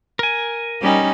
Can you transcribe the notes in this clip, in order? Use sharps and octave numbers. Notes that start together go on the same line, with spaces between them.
A#4 G#5
G3 C#4 D#4